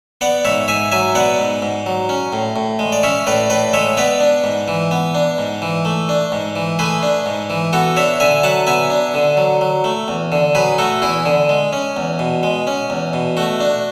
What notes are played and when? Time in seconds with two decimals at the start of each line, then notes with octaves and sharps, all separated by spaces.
0.21 B3 D5 F#5
0.45 G#2 C#5 E5
0.68 G#2 E5 G#5
0.92 F#3 E5 G#5
1.15 B3 D5 F#5
1.39 G#2
1.62 G#2
1.86 F#3
2.09 C#4
2.33 A2
2.56 A2
2.79 G#3
2.92 D5
3.03 C#4 C#5 E5
3.27 A2 B4 D5
3.50 A2 B4 D5
3.73 G#3 C#5 E5
3.97 B3 B4 D5
4.21 D4
4.44 G#2
4.68 E3
4.91 B3
5.15 D4
5.38 G#2
5.62 E3
5.85 A3
6.09 D4
6.32 G#2
6.56 E3
6.79 A3 G#4 B4
7.03 D4
7.26 G#2
7.50 E3
7.73 B3 F#4 A4
7.96 D4 C#5 E5
8.20 D3 E5 G#5
8.43 F#3 F#5 A5
8.67 B3 E5 G#5
8.90 D4
9.14 D3
9.37 F#3
9.61 F#3
9.84 A3
10.08 E2
10.32 D3
10.55 F#3 G#4 B4
10.78 A3 F#4 A4
11.02 E2 E4 G#4
11.26 D3
11.49 G#3
11.73 C#4
11.97 E2
12.19 B2
12.43 G#3
12.67 C#4
12.90 E2
13.13 B2
13.37 A3 F#4
13.60 D4